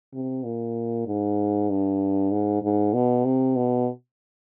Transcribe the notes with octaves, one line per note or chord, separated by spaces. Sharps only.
C3
A#2
G#2
G2
G#2
G#2
B2
C3
B2